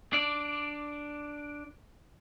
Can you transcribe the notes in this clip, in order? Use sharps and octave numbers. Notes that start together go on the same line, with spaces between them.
D4 D5